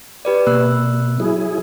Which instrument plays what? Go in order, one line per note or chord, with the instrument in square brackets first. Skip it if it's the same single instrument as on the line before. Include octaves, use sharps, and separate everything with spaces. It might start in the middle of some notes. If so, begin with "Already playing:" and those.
[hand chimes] G4 B4 D5
[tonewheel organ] B2 [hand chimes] A#3 E6 F#6
[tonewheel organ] F#3 E4 G#4